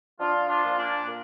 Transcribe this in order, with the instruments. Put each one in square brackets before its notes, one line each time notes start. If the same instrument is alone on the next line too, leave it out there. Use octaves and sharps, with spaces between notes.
[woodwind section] F3 D4 F4
D4 F4
A#2
A#3 D4
A#2